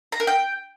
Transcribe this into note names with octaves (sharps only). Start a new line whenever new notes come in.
A#5
A#4
G5